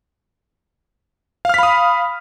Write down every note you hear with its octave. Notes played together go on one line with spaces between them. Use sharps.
F5 B5 D#6 F6 B6